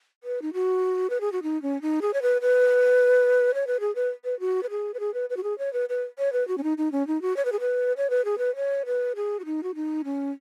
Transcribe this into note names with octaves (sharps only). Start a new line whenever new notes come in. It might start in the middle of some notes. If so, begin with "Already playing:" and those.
B4
D#4
F#4
B4
G#4
F#4
D#4
C#4
D#4
G#4
C#5
B4
B4
C#5
B4
G#4
B4
B4
F#4
B4
G#4
B4
G#4
B4
B4
F#4
G#4
C#5
B4
B4
C#5
B4
F#4
C#4
D#4
D#4
C#4
D#4
F#4
C#5
B4
G#4
B4
C#5
B4
G#4
B4
C#5
B4
G#4
F#4
D#4
F#4
D#4
C#4